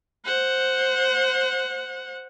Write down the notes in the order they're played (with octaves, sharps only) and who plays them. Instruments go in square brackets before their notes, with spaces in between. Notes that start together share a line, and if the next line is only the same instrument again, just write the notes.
[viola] C5 F#5